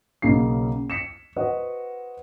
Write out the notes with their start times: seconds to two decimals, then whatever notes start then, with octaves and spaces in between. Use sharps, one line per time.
0.22 B1 C#3 A#3 C7
0.90 B6 C#7 E7
1.36 F#4 B4 C5 D#5 F#5